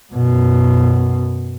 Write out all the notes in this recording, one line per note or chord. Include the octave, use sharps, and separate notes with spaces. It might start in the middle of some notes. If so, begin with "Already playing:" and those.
F#2 B2